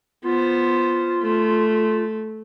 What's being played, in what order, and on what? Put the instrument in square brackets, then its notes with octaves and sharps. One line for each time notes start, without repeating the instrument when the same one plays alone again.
[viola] B3 C5 [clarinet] F4
[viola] A3